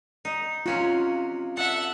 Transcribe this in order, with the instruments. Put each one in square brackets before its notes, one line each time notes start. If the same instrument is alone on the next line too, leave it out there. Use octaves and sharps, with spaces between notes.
[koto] D#4
[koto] C3 C#4 F#4 [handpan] F4
[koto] A4 [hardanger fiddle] E5 F#5